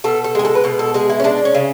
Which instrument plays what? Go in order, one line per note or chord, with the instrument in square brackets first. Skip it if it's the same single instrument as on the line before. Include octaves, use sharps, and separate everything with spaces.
[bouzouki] B2 A4
A4
G#3 G#4
A4
B4
B2 A4
A4
G#3 G#4
E4
C#4
G#3 D4
C#4
C#3